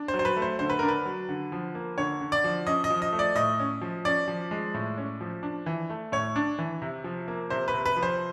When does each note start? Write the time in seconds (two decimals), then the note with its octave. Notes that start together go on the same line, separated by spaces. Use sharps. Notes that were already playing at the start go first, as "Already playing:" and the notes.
Already playing: D4
0.08 C5
0.14 F#3
0.19 C5
0.25 B4
0.36 A3
0.42 C5
0.59 D3 C5
0.70 B4
0.79 D4 A#4
0.88 B4
1.06 F#3
1.29 D3
1.52 F3
1.75 A#3
1.97 D3 C#5
2.21 D3
2.32 D5
2.44 F3
2.67 C#4 D#5
2.84 D#5
2.90 F3
3.02 D#5
3.12 A3
3.19 D5
3.36 A2 D#5
3.60 C#4
3.82 F3
4.05 C#4 D5
4.28 F3
4.51 G#3
4.74 A2
4.98 C#4
5.21 F3
5.43 D4
5.66 E3
5.90 A3
6.12 A2 C#5
6.36 D4
6.59 E3
6.82 C3
7.04 F3
7.28 A#3
7.50 C3 C5
7.68 B4
7.74 C3
7.85 B4
7.97 F3
8.03 C5